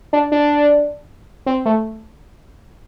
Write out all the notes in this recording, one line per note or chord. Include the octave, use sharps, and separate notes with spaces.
D4
D4
C4
A3